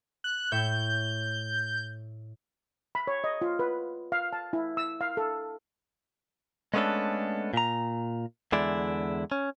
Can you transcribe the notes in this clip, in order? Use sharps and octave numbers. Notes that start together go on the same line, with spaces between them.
F#6
A2 C#5 E5 G6
B5
C#5
D#5
F4
B4
F5
A5
E4
E6
F5
A4
G#3 A3 B3 C#4 D4 A4
A#2 A#5
E2 D3 G#3 E4 D5
C#4